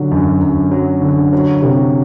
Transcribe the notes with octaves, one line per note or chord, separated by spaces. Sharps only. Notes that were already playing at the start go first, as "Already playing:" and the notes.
Already playing: D3 F#3
F#2
F#2
F#3
D3
F#3
C3